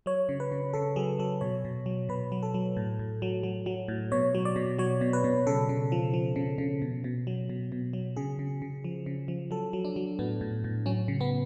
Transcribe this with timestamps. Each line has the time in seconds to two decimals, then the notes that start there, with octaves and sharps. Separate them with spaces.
0.06 F#3 C#5
0.29 C#3
0.40 B4
0.52 C#3
0.73 C#3 A4
0.96 F#3 G#4
1.19 F#3 A4
1.41 B2 C#5
1.65 B2
1.86 F#3
2.09 B2 B4
2.32 F#3
2.43 A4
2.54 F#3
2.77 A2
2.99 A2
3.22 F#3
3.43 F#3
3.66 F#3
3.88 A2
4.12 B2 C#5
4.35 F#3
4.45 D5
4.56 B2
4.79 F#3 C#5
5.01 B2
5.13 B4
5.24 B2
5.47 C#3 A4
5.69 C#3
5.92 F3
6.14 F3
6.36 C#3
6.58 C#3
6.82 B2
7.04 B2
7.27 F#3
7.49 B2
7.72 B2
7.93 F#3
8.16 C#3 G#4
8.39 C#3
8.62 C#3
8.84 F3
9.06 C#3
9.28 F3
9.51 F#3 A4
9.73 F#3
9.85 D4
9.96 F#3
10.19 A2 B3
10.41 A2
10.64 A2
10.86 F#3 C#4
11.08 C#3
11.21 B3